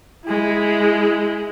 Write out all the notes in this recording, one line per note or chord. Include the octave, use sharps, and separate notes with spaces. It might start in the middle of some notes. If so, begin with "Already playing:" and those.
G#3 E4